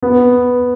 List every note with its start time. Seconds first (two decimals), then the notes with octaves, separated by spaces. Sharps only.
0.03 B3